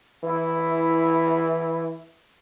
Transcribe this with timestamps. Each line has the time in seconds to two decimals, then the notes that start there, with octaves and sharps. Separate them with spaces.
0.24 E3 E4